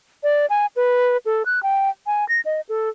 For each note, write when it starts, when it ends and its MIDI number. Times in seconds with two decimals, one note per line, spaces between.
0.23 0.46 74
0.50 0.66 80
0.76 1.17 71
1.26 1.43 69
1.46 1.62 90
1.63 1.90 79
2.06 2.27 80
2.28 2.41 94
2.45 2.61 75
2.69 2.89 69